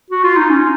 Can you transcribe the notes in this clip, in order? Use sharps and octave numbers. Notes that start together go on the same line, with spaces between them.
F#4
F4
D#4
C#4